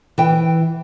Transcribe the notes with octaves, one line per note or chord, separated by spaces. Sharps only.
E3 G5